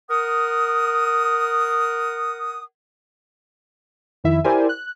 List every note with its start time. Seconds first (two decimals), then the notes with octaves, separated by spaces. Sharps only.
0.10 A#4 F#5 D#6
4.24 F2 D#3 E4 E5
4.44 E4 G4 A#4 C5 D5 G#5
4.69 F#6